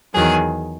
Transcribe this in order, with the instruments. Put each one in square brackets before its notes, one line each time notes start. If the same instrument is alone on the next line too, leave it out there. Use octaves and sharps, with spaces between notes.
[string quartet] E2 D#3 F#3 G#4